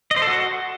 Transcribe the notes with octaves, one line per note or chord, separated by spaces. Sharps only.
D#5
C5
A4
F#4